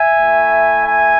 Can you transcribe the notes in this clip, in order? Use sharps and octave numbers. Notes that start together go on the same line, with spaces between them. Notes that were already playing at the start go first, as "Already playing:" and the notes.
Already playing: E5 G#5
A3 E4
E5 G#5